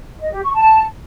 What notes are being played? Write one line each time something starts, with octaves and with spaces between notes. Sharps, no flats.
D#5
G4
C#6
A5